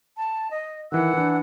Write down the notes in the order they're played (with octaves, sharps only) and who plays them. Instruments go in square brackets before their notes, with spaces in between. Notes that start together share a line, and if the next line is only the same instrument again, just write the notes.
[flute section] A5
D#5
[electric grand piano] D#3 E3 [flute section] F#5 E6 F#6
[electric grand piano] E3 D4